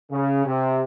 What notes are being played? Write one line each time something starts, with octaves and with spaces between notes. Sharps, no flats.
C#3
C3